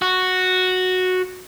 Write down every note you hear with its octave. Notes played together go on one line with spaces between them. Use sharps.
F#4